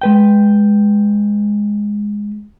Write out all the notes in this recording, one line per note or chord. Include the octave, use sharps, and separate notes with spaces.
G#3 B4 G5